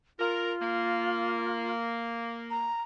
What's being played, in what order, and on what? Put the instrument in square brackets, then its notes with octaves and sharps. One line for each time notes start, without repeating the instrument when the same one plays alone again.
[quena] F4 [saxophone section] A#4
[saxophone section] A#3
[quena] A#5